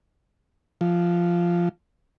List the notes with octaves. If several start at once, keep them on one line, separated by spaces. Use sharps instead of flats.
F3